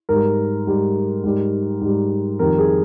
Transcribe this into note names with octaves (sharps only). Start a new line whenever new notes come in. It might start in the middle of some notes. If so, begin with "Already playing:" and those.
G#2 G3 A#4
G#2 G3
G#2 G3
G#2 G3
F2 D#3 G3 A#4
G#4